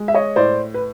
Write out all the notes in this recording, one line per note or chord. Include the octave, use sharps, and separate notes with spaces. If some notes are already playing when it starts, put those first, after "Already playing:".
Already playing: G#3
E5
C#5 D#5
A2 C5 D5
B4